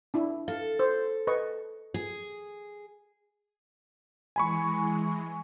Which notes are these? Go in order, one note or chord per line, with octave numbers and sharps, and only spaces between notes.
D4 E4
A4 F5
C5
B4 D#5 C#6
G#4
E3 G#3 G#5 B5 C#6